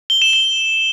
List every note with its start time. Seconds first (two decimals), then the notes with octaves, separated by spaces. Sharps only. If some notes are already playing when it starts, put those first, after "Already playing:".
0.10 G7
0.22 E7
0.33 G7